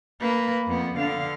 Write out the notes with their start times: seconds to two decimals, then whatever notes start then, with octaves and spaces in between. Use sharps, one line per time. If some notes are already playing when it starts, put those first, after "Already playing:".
0.21 A#3 B4
0.68 F2 B3
0.97 D3 F5